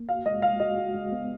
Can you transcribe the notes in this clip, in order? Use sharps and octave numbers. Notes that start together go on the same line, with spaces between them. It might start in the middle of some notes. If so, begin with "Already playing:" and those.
Already playing: A#3
F#4 F5
G#3 D#5
G#3 F5
F#4 D#5
F#4
G#3
B3